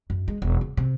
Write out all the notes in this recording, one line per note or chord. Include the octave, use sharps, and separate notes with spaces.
F#2
G#3
E1
C#3
C3